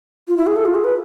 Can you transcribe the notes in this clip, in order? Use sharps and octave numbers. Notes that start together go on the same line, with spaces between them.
F4
E4
G#4
A4
F4
G#4
B4